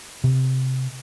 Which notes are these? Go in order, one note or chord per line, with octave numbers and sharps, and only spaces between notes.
C3